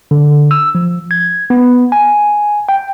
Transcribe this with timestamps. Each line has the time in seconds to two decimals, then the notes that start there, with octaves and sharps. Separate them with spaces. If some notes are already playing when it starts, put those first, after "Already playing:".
0.11 D3
0.51 E6
0.75 F3
1.11 G#6
1.50 B3
1.92 G#5
2.69 G5